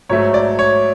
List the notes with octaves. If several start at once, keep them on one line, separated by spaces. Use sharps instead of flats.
G#2 F#3 A3 C#5
D5
C#5